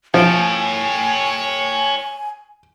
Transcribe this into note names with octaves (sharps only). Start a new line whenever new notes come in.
F3 C#5 G5 G#5